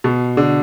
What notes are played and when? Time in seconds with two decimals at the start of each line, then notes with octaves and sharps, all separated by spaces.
0.04 B2
0.37 D3